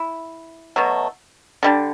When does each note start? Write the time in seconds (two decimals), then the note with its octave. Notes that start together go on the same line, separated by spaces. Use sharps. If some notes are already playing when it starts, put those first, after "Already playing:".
Already playing: E4
0.76 B2 F#3 A3
1.63 D3 G3 D4